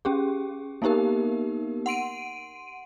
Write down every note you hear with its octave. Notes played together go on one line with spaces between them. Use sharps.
C#4 G4 G#4
A#3 B3 D#4 G4 A#4
F#5 C6 D7 D#7